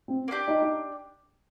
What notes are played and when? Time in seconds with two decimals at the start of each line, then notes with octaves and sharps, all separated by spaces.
0.08 C4
0.28 A#3
0.31 D4 G4
0.48 D#4
0.62 D#4